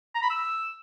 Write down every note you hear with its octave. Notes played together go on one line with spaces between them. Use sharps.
A#5
B5
E6